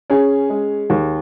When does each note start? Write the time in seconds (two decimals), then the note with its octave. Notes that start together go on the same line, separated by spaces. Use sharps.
0.10 C#4 G#4
0.50 G#3
0.90 D#2